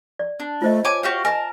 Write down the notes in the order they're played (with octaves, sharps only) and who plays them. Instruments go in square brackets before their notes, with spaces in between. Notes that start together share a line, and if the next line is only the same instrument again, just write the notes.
[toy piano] D5
[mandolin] D4
[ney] A3 [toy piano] F4 C5 D#5
[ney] C#5 [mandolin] G#5 D6
[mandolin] F#4 G4 F5
[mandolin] A#4 A5 [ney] D#5 [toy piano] G#5